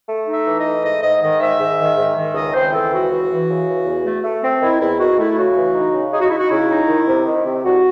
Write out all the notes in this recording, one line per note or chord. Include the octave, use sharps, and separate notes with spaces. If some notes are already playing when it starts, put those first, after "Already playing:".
A3
D#4
E5
E3
D#5
A3
G#2 D#5
G#2 D#5
D#3 D#5
G#2 E5
G#2
D#3
G#2
D#3
C#2 D#5
C4 C5
E3 A4
C#2 F#4
E3
E3
C#3
E3
E2
A3
A3
C4
D#3 E4
E2 E4
D#3 F#4
A3 E4
C#3 F#4
E3
D#4
C#3
D#4 G#4
F#4
D#4 E4
F#4
C#3 E4
D#4
D#3
C3
D#3
C3
C2 F#4